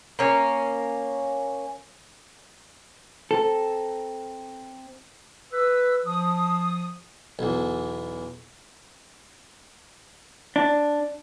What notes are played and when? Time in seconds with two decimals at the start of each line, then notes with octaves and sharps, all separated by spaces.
0.19 A#3 C#4
3.31 C4 A4 A#5
5.53 B4 E6
6.06 F3 D#6
7.39 B1 E2
10.56 D4